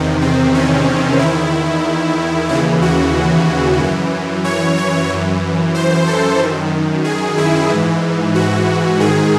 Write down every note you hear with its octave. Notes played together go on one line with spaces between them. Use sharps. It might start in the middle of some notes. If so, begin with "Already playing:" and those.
Already playing: E2 C3 D#3
C4
C#4
E2 D#3 E4
D#2 C#3 E3 E4
F#4
F#2 E3
C#5
C#5
F#2 E3
C5
A4
F#2 D#3
G#4
E4
G#2 E3
F#4
G#2 D#3 G#4